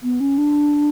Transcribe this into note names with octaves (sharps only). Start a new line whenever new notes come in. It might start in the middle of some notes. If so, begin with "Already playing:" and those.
B3
C#4
D4